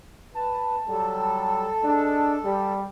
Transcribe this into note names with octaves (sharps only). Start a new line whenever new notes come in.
B4 A5
F#3 G3 A4
G#3 D4
G3 D5